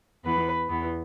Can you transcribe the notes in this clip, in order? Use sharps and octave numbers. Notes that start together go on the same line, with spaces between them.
E2 E3 B3 B4
E2 E3 B3